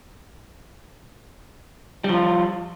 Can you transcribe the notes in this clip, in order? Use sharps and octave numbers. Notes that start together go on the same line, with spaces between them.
F3 G3 F4